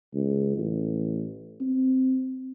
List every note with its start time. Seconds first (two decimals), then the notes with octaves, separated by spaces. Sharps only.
0.14 C#2
0.57 A1
1.61 C4